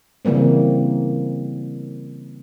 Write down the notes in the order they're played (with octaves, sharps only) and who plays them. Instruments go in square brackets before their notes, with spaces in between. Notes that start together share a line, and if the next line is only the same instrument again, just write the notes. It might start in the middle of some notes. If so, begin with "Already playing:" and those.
[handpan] C#3 E3 G3 A#3 C4